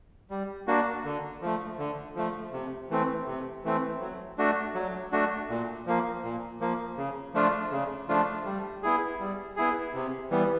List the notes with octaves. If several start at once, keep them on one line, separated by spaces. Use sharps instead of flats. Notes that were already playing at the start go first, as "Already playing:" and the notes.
G3
A#3 D4 F#4
D3
F3 A3
D3
F3 A3
C3
E3 A3 C4
C3
E3 A3 C4
F#3
A3 D4 F#4
F#3
A3 D4 F#4
A#2
F3 A#3
A#2
F3 A#3
C#3
F3 A3 D4 F4
C#3
F3 A3 D4 F4
G3
B3 E4 G#4
G3
B3 E4 G#4
C3
E3 G3 B3